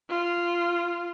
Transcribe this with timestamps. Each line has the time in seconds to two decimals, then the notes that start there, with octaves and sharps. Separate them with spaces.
0.10 F4